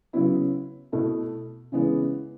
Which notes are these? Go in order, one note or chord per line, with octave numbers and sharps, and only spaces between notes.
C#3 F#3 B3 E4
B2 A3 E4
C#3 E3 G#3 B3